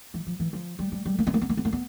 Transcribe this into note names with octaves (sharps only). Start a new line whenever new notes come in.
E3
F3
E3
F3
G3
G3
G3
A#3
B3
A#3
B3
A#3
B3
A#3
B3